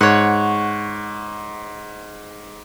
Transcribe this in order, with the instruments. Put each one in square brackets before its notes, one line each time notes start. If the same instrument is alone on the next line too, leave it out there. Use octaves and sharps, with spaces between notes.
[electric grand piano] G#2 [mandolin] C#5 F#5